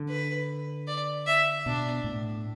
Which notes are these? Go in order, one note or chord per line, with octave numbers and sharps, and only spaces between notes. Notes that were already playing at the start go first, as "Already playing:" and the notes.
Already playing: D3
B4
D5
E5
B2 D4
A2